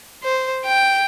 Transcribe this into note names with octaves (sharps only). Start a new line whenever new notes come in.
C5
G5